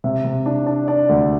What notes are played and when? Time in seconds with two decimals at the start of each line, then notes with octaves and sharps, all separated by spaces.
0.04 C3 E5
0.25 C3
0.46 D4
0.67 D4
0.88 D4 D5
1.09 D2